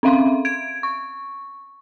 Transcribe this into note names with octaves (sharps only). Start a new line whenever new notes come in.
C4 C#4 E5 F5 C6
G#6 D7
C#6